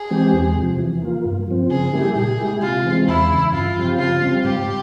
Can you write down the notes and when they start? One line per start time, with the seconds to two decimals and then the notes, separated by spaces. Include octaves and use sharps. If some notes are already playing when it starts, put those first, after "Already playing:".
Already playing: G#4
0.11 E3 G#3 C4 G4
0.33 E2
0.57 C3 F3
0.79 E3
1.02 A#3 F4
1.25 G2
1.48 F3 C4
1.70 C#3 G#4
1.93 G3 A#3 E4 G4
2.16 A#2 G#4
2.39 G#3 E4 G4
2.62 C3 F4
2.85 E3 G#3 C4
3.08 E2 E4
3.31 C#3 E3
3.53 G2 F4
3.75 F3 C4 G4
3.98 C#3 F4
4.22 G3 C4
4.44 G#2 G4